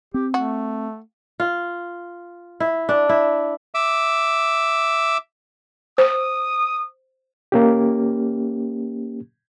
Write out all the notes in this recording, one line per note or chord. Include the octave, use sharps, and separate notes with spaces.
C4 G4
A3 F#4
F4
E4
D4
E4
E5 D6
C5 D#6
A#3 C#4 G4